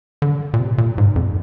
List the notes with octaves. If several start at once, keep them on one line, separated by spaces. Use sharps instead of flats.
D3
A#2
C3
A#2
G#2
F2